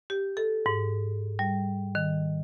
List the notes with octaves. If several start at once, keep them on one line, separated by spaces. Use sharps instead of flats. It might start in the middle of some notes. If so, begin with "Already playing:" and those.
G4
A4
G#2
G3
D#3